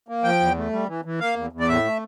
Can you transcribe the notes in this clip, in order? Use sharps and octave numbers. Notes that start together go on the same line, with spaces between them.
A#3
F3 G5
E2
A3
G3
E3
E3
A#3 F5
E2
E2
D5
A2 E5
A3